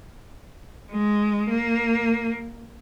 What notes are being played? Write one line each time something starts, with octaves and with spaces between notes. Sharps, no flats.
G#3
A#3